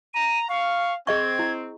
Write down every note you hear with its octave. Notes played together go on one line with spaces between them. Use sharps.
A#5 D#7
F5 C#6
C4 G#4 D#5 C#6 G#6
E4